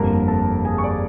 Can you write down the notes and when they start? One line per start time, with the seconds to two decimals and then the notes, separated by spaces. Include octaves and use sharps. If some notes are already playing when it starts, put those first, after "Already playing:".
Already playing: G1 F2 D3 G3 A#3 A#4 A#5
0.28 A4 A5
0.65 G#4 G#5
0.78 C#6
0.83 D5 D6